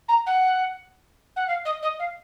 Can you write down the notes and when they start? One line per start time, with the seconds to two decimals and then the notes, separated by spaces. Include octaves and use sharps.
0.08 A#5
0.26 F#5
1.36 F#5
1.47 F5
1.65 D#5
1.82 D#5
1.99 F5